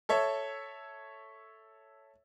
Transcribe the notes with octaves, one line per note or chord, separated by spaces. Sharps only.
A4 C#5 E5